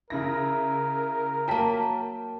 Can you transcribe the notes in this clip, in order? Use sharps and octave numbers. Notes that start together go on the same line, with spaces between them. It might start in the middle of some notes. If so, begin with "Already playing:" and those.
C#3 E4 A#4 A#6
F#3 A#3 G5 A5 B6